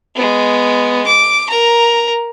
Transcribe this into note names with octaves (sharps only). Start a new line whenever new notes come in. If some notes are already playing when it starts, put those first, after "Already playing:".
G#3 B3
D6
A#4 A#5